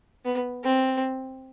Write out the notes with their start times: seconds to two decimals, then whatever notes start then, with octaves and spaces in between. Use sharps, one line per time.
0.25 B3
0.64 C4